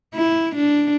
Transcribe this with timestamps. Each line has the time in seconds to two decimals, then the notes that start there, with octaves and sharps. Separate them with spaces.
0.15 E4
0.56 D4